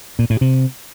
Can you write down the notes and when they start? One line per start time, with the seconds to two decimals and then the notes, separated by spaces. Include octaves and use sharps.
0.19 A#2
0.30 A2
0.41 C3